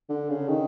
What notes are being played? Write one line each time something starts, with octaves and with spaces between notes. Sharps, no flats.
D3
C#3
D#3